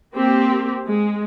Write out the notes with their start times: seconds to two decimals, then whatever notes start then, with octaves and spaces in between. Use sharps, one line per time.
0.16 A#3 C4 G4
0.87 G#3